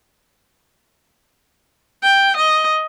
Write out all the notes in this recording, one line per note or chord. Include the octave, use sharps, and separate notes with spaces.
G5
D#5